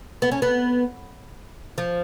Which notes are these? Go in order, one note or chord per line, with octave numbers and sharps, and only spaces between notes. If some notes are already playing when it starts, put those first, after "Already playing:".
B3
C#4
B3
F3